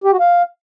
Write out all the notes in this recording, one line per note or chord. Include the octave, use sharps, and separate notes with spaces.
G4
F#4
F5